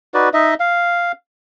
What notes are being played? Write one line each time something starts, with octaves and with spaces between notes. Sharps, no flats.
D#4 F#4 B4 D5
D#4 D#5 E5
F5